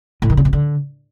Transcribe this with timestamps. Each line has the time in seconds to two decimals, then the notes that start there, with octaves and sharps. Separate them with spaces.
0.22 A2
0.30 D#3
0.37 C#3
0.45 B2
0.53 D3